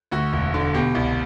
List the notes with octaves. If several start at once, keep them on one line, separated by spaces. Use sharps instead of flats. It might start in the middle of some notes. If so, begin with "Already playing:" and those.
D2 F#4
E1
D3
B2 G4
C2